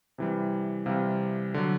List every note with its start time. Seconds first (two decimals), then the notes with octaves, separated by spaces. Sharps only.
0.18 C3 E3 G3
0.86 C3 E3 G3 F5
1.54 D3 F#3